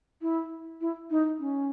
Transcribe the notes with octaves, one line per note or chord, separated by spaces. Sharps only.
E4
E4
D#4
C#4